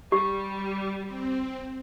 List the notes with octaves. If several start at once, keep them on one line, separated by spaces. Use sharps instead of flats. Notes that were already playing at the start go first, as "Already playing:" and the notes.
G3 G4
C4